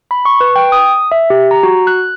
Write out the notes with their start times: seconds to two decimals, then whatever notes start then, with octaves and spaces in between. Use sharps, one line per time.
0.11 B5
0.25 C#6
0.41 B4
0.56 G5
0.72 D#6
1.12 E5
1.30 G4
1.51 A#5
1.63 F#4
1.87 F#6